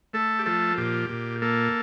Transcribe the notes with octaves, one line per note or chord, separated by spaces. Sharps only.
A3 A4
G4
F3 A4
A#2 G4
A#2
A#3 A4